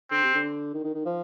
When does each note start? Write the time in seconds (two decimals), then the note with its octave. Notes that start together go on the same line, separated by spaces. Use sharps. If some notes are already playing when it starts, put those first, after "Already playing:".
0.11 D3 C4
0.23 C3
0.35 D3
0.74 D#3
0.84 D#3
0.94 D#3
1.05 F3